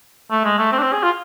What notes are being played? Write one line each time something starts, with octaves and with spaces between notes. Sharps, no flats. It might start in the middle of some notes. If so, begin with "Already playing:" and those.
A3
G#3
A3
C4
D4
C4
G#4
F4